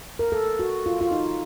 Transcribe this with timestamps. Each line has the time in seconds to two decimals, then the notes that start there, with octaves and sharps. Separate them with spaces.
0.19 A#4
0.32 A4
0.59 F#4
0.86 F4
1.01 F4
1.11 D#4